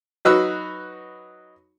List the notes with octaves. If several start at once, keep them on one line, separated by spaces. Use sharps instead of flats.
F#3 D#4 F#4 B4 E6